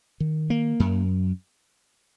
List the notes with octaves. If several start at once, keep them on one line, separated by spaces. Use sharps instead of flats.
D#3
A#3
F#2